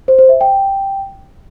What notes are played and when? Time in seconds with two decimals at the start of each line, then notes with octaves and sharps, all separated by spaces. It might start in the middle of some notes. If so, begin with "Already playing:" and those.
0.08 C5
0.19 C5
0.29 E5
0.41 G5